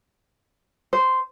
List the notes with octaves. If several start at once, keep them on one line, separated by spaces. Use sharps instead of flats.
C5